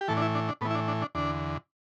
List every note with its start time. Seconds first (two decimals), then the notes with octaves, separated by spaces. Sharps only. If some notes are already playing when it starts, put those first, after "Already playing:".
0.01 G4
0.08 A2 E3 A4
0.17 D4
0.22 E4
0.35 D4
0.48 D4
0.61 A2 B3
0.65 E3
0.70 E4
0.75 D4
0.88 D4
1.01 D4
1.15 E2 D3 D4